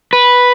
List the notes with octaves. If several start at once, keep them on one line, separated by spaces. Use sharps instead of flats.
B4